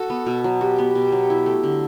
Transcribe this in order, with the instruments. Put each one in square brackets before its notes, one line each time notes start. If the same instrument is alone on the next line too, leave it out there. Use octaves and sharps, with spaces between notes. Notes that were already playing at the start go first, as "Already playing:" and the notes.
Already playing: [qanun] F#4 [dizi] A4
[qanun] B3
B2
F#3
[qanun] F#4 [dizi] G4
[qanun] B3
B2
F#3
E4
A3
D3